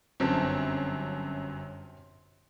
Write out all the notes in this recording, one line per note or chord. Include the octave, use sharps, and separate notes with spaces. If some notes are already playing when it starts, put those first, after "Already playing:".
G1 F#2 C4 A5